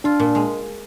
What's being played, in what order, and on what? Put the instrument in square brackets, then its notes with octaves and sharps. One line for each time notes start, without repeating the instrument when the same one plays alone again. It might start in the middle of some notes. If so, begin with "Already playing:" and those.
[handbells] D4 [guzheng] F4
[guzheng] A#2
G#3